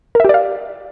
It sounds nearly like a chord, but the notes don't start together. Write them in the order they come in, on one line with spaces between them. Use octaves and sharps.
A#4 E5 G4 D5 F5